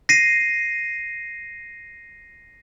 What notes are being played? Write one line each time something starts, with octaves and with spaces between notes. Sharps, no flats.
A#6 C7 D#7